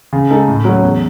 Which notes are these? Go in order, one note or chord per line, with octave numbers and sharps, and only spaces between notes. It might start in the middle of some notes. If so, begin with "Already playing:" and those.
C#3
G#3 D#4 A4
A2
F#3 A3 C#4
E2